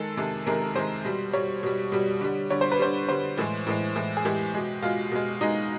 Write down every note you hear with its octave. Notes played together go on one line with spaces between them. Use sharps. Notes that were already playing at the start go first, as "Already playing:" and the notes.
Already playing: D#3 G#3 A4
C3 D#3 G#3
C3 D#3 G#3 A#4
A#4
C3 D#3 G#3 C5
B2 G3
B2 G3 C#5
B2 G3
B2 G3
D3 G3
D3 G3 C#5
C5
B4
D3 G3 C5
D3 G3 C5
A2 E3 G#3
A2 E3 G#3
A2 E3 G#3
G#4
A2 E3 G#3 G4
B2 G#3
B2 G#3 F4
B2 G#3
B2 G#3 D#4